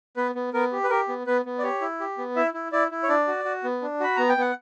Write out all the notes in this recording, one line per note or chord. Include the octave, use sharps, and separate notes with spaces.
B3 B4
B3
B3 A#4
G4
B4
G4 A#4
B3
B3 B4
B3
D5
G4 C#5
E4
G4
B3
E4 E5
E4
E4 D5
E4
C#5
D4 D5
F#4
F#4
B3
D4
F#4 B5
B3 A#5
G5
B3 F#5